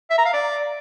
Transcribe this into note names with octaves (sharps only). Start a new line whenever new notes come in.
E5
A#5
F5
D5